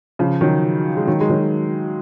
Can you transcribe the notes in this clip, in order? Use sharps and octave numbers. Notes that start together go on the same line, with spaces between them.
C#3 F3
D#3 F#3
G#3
D#3 F#3
G#3
D#3 F#3